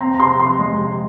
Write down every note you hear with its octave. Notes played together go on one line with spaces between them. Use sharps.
C4 A#5
A#5
C3 C6
C3 C6
G#3
C3